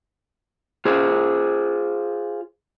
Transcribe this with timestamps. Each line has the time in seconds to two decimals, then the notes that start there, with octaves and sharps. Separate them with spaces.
0.85 F4 G#4 C5